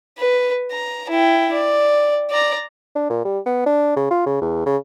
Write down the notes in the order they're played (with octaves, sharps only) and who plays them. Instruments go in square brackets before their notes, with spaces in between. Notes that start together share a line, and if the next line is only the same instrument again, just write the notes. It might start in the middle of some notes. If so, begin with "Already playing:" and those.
[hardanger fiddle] B4
A#5
E4 G5
D5
D5 A#5
[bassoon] D4
A#2
G3
B3
D4
C#3
F4
C#3
E2
C#3